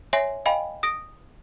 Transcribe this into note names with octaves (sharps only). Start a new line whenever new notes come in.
C#5 E5 G#5 C6 A#6 C7
D#5 F5 G5 G#5 B5
D#6 A#6 D7